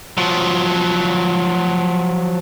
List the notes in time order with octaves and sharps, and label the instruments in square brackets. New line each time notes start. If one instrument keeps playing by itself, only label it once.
[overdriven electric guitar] F3 F#3